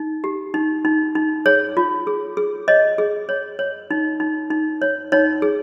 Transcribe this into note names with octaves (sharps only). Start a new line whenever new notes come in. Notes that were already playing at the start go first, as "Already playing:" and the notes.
Already playing: D#4
G4
D#4
D#4
D#4
G#4 C#5
F4
G#4
G#4
C#5 D#5
G#4
C#5
C#5
D#4
D#4
D#4
C#5
D#4 C#5
G#4